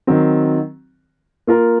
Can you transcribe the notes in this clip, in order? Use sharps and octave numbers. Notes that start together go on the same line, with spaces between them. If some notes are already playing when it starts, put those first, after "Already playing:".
D#3 F#3 C4
A#3 F4 A#4